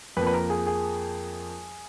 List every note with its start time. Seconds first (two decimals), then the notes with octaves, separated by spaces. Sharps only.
0.17 F2 B4
0.19 F3 A#3
0.27 B4
0.34 A#4
0.50 G#4
0.66 G#4